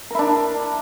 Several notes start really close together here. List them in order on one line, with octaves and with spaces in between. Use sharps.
A#4 E4 D4